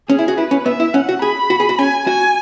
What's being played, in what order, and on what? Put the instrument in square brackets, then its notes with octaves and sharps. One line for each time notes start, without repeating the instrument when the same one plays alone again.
[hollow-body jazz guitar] C#4 [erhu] G#4
[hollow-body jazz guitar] E4
F#4
[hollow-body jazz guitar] E4 [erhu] B4
[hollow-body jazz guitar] C#4
[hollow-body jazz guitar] B3 [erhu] E5
[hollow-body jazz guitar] E4
[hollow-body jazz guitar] C#4 [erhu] F#5
[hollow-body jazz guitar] F#4
[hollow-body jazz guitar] G#4 [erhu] B5
[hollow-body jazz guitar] F#4
G#4
F#4
[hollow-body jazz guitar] C#4 [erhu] G#5
[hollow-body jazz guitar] F#4 [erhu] G#5